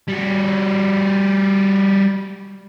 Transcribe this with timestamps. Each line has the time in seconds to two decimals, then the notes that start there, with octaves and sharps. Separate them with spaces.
0.08 G3 F#4